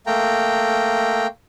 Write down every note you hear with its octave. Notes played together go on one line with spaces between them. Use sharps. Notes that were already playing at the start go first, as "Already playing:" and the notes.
A3 A#3 G5 A#5